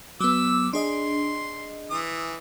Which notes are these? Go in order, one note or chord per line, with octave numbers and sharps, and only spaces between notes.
F#3 B3 D6 E6
D4 G#4 D#5 C6
E3 D#6